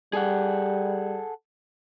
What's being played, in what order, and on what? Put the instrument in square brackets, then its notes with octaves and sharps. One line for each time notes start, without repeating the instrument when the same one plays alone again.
[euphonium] G3 [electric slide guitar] G#4 A4 F#5